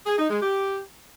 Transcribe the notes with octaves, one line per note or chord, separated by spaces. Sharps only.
G#4
D#4
G#3
G4